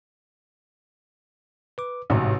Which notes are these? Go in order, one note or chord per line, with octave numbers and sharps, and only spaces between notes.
B4 D6
A1 G#2 C3 F#4